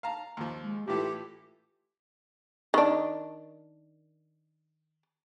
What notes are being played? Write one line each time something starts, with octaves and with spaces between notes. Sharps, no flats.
F5 A5 A#5
D#2 F3
G#3
A2 E3 F4 G4 A4
D#3 D4